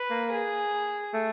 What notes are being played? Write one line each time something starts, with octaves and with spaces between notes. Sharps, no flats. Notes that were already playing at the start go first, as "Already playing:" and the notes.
Already playing: B4
A#3
G#4
A3